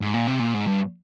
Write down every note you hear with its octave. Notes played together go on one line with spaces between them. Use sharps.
G#2
A#2
C3
A#2
G#2
G2